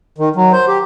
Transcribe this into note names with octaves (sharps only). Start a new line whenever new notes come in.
D#3
F#3
C5
G4